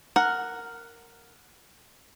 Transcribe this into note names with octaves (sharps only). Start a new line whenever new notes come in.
A#4 F#5